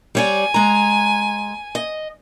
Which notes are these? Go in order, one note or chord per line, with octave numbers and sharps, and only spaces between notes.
G3 C#5 D5 G#5
G#3 A#5
D#5